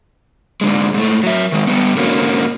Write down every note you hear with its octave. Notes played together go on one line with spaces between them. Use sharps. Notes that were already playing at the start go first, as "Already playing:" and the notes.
G#2 D3 G#3
G#2 A3
F#3 E5
D#3 G#3
G3 B3
G#2 D3 A#3 C#4 F#4